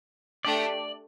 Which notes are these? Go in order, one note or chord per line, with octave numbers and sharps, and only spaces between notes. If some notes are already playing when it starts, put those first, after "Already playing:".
A3 D4 G4 D5